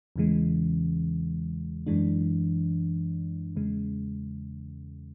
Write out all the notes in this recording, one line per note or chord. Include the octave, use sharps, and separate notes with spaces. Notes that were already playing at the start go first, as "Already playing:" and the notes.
E2 C#3 E3 G#3
F#2 E3 G#3 D4
E2 C#3 G#3